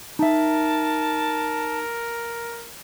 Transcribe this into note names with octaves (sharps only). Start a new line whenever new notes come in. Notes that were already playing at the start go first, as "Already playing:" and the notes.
D#4 A#4 E5 A5